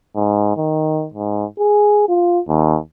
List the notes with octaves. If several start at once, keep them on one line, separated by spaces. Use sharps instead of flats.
G#2
D#3
G#2
G#4
F4
D#2